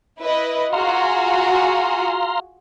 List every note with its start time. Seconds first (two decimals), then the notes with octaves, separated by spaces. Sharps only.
0.20 E4 B4 D#5
0.73 F4 F#4 G#4 F5 A#5 C6